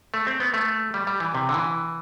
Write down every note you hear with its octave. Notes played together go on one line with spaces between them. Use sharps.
A3
C4
B3
A3
G3
G3
E3
C3
D3
E3